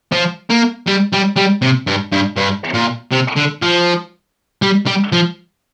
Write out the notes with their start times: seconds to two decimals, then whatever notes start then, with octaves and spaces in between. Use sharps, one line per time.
0.12 F3
0.50 A#3
0.87 G3
1.13 G3
1.36 G3
1.62 C3
1.87 G2
2.12 G2
2.37 G2
2.74 A#2
3.12 C3
3.36 D3
3.63 F3
4.62 G3
4.87 G3
5.12 F3